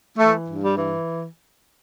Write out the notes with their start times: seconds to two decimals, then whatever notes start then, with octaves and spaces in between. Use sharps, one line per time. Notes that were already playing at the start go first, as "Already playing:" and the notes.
0.17 E3 A3
0.47 G2
0.62 G3
0.77 E3